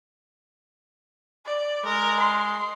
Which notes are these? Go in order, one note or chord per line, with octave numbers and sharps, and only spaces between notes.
D5
G#3 A#4
C6